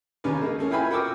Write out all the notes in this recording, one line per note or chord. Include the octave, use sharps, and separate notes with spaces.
D#2 C#3 C#4 D4 B4
G#3 A#3
A#3 C#4 A4
E4 F4 B4 G5 G#5 B5
F#4 A#4 G5 C#6 D6 E6